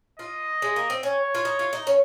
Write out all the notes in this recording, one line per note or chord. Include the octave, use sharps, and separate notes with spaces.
F4 D#5
G#3
A#3
C4
C#4 C#5
F4
D#4
F4
D#4
C#4